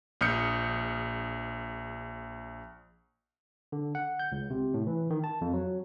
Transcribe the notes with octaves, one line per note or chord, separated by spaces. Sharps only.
A#1 D#6 F6 G6 C#7
D3
F#5
G6
C#2
C3
A2
E3
D#3
A5
F2
F#3